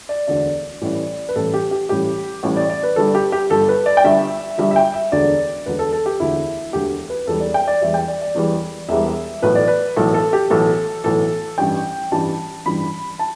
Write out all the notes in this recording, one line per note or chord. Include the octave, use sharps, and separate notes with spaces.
D5
E1 D2 D3 D5
A1 A2 E3 G3
B4
A1 A2 E3 G3 A4
G4
G4
A1 A2 E3 G3 G4
A1 A2 E3 G3
D5
D5
B4
G1 G2 G3 A4
G4
G4
G1 G2 G3 A4
B4
D5
G5
G1 G2 G3 E5
G1 G2 G3 E5
E5
G5
E5
E1 D2 D3 D5
E1 D2 D3 B4
A4
A4
G4
E1 D2 D3 E4
E1 D2 D3 G4
B4
E1 E2 E3 G3 A4
D5
G5
D5
E1 E2 E3 G3 E5
G5
D5
D5
E1 E2 E3 G3
E1 E2 E3 G3 E5
B1 A2 E3 B4
D5
B4
B1 A2 E3 A4
A4
G4
B1 A2 E3 A4
B1 A2 E3 A4
A1 G2 E3 G3 G5
A1 G2 E3 G3 A5
A1 G2 E3 G3 B5
A5